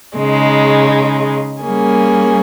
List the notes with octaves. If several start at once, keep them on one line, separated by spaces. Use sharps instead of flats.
C#3 G#3 D#4
G3 A#3 C#4 G#4